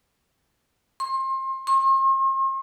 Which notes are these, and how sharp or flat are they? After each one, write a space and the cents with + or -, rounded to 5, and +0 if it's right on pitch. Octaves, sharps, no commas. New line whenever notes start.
C6 +30
C6 +45